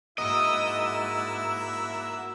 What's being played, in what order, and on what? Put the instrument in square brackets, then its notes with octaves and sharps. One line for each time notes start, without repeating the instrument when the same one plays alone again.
[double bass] G#2 [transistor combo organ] A#3 F#4 E5 [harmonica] E4 E6 [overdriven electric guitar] D#5